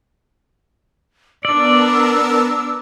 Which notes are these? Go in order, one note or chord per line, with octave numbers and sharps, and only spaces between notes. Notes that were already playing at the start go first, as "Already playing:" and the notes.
B3 D4 A#4 D5 A5 E6